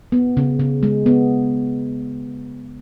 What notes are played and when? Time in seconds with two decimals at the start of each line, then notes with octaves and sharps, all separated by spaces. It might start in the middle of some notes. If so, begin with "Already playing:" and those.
0.12 B3
0.37 C#3
0.60 C#3
0.83 G#3
1.06 B3